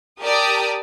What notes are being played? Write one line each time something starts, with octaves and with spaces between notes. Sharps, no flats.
G4 A#4 D5 A5 D#6